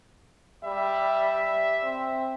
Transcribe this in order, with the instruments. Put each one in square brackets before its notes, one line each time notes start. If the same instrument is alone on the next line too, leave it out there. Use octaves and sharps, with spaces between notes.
[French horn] G3 [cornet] E5
[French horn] C4